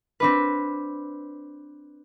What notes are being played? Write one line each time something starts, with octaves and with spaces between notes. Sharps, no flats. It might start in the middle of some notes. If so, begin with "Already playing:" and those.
C4 D4 B4